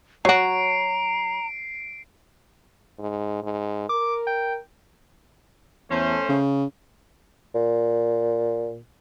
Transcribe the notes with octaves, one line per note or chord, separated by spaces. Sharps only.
F#3 F#4 C#5 F#5 A#5 C7 D7
G#2
G#2
A#4 D6
G5
E2 A3 C#4 C5
C#3
A#2